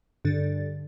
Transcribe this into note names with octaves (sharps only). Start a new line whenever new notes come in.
G2 D3 A6